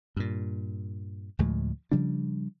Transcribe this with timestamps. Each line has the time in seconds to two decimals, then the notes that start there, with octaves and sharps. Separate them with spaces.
0.17 G2 A#2
1.39 D2 A2 F3 G#3
1.92 C#3 F3 G3 D4